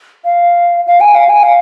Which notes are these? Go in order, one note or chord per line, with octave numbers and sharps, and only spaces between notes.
F5
F5
G#5
F5
G#5
F5